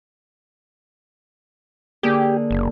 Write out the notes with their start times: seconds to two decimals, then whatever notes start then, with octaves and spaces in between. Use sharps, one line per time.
2.03 D3 A#3 G4 G#4
2.51 F#1